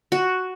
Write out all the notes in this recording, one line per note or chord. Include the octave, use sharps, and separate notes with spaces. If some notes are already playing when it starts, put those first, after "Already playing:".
F#4